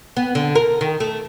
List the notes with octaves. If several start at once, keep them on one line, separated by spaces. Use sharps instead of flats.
B3
D3
A#4
D#3
A3